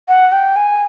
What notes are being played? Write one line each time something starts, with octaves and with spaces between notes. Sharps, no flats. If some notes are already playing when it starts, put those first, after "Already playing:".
F#5
G5
G#5